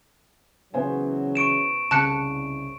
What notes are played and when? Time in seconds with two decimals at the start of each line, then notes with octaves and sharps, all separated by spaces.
0.74 C#3 E3 F#3 B3 C5 G#5
1.35 C#6 D7 E7
1.91 C2 C#3 A5 F#6 C#7